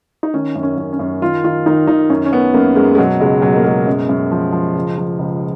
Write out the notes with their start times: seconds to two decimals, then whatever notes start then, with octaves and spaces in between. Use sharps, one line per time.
0.23 D#4
0.34 D#3 C#4
0.55 F#2
0.63 C#4
0.77 F#2
0.93 C#4
0.99 F#2
1.22 D#3 F4
1.44 D#3 F4
1.66 D#3 D#4
1.87 D#3 D#4
2.10 F#2 C#4
2.26 C#4
2.32 F#2 B3
2.54 F#2 A#3
2.76 F#2 G#3
2.95 G#3
2.98 B2 F#3
3.20 C#2 G#3
3.42 B2 F#3
3.56 A#3
3.64 B2 G#3
3.87 F#2
4.09 F#2
4.31 F3
4.53 F3
4.76 C#2
4.98 F3
5.19 C#2